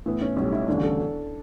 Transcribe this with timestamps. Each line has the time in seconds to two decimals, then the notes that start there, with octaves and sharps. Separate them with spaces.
0.06 A2 E3 B3 E4
0.21 C#4
0.36 B1 A2 G3 C#4
0.52 E4
0.67 E1 D2 C#3 G3 D4
0.83 A4